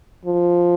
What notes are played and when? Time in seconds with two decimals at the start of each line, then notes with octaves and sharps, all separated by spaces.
0.25 F3